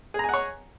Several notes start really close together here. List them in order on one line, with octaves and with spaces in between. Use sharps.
G#4 A#5 G#5 F#5 C#5